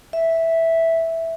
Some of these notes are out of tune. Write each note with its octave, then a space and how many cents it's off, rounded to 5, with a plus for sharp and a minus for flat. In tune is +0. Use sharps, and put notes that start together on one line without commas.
E5 -5